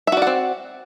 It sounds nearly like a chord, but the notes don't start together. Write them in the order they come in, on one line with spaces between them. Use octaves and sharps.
E5 F#4 D5 F#5 C4